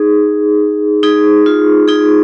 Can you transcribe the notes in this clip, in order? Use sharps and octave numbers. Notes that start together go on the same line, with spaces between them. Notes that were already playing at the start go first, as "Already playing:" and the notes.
Already playing: D#4 G#4
D#4 G#4
F4
D#4 G#4